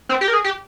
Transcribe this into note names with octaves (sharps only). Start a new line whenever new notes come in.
C4
G4
A#4
G#4
G4